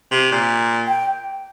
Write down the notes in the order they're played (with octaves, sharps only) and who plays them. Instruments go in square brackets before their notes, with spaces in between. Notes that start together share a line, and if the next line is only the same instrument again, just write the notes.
[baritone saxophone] C3
A#2
[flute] G5